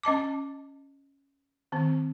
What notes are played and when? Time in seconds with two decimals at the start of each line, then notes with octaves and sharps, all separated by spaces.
0.03 C#4 D#5 A5 D6
1.72 D#3 C4